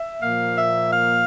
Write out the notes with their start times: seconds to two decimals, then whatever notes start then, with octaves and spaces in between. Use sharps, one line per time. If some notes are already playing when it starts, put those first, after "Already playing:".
Already playing: E5
0.20 A#2 F3 A#3 F5
0.57 E5
0.92 F5